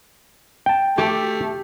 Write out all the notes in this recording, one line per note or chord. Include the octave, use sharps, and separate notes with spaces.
G5 A5
A3 G4